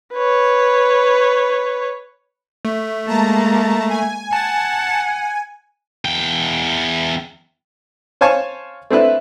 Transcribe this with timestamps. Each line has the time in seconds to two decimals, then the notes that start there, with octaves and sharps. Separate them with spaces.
0.14 B4 C#5
2.65 A3
3.07 G#3 A#3 A5 A#5
3.89 G#5
4.33 F#5 A5 A6
6.05 E2 G5
8.21 C5 C#5 F5 G#5 A5 C#6
8.90 A3 C4 D4 E4 B4